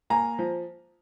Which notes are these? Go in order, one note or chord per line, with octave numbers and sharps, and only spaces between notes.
A#3 G#5 A#5
F3